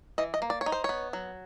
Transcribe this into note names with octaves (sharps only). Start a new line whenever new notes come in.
E3 D#5
D#5
A#3
D5
C#5
D#4
C5
B3 C#5
F#3